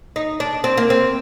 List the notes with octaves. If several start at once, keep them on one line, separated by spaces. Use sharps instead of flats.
D#4
D4
C4
A#3
C4